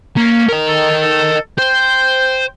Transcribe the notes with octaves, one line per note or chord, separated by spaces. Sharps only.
A#3 C#4
A#4 D#5
A4
A4
C5 G5